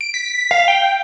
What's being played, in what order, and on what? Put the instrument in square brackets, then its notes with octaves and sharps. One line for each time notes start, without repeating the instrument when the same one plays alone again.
[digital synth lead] D7
B6
F5
G5